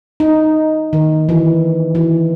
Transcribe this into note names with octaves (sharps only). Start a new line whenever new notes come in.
D#4
D#3
E3
E3